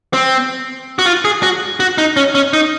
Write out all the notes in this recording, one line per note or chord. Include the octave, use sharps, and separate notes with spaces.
C4
F#4
F4
G#4
F#4
F#4
D#4
C#4
C#4
D#4